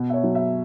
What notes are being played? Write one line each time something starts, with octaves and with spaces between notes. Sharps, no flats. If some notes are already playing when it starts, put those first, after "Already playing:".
Already playing: B2
E5
C#5
F#3
E5